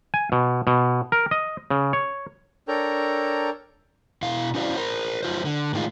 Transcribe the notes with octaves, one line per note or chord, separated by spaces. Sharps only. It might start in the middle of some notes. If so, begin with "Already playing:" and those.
G#5
B2
B2
A#4
D#5
C#3
C#5
D4 A4 A#4 C#5 G5 A#5
B2 E4 F5
C#4 E4 F#4 C5 D5 F5
A#4 C5
F#2 E3 F4 B4 C5
D3
A2 D#3 G#3 F4